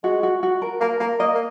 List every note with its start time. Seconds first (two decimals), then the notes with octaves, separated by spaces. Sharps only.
0.03 G#3 F#4
0.23 F#4
0.43 F#4
0.62 A#4
0.81 A#3 A#4
1.00 A#3 A#4
1.19 A#3 D#5
1.35 A#3